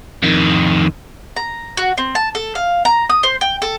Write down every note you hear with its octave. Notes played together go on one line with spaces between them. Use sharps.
F2 D#3
A#5
F#4
C4
A5
A4
F5
A#5
D#6
C5
G5
A4